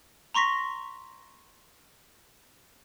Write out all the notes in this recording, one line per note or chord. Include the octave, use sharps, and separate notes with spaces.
A#5 C6 C#6 A#6 B6